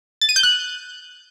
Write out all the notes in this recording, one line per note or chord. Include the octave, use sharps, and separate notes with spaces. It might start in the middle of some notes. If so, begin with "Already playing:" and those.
A6
D#7
G6
F#6